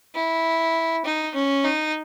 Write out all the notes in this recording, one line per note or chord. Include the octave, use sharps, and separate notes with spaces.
E4
D#4
C#4
D#4